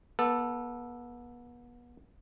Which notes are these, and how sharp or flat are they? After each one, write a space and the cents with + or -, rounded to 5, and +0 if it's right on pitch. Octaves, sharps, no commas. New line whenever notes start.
B3 -35 A4 +0